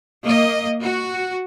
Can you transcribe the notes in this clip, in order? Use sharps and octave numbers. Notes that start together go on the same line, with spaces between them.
A#3 D#5
F#4